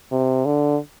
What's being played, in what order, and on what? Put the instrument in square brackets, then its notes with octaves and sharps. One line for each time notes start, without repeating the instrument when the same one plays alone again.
[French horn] C3
D3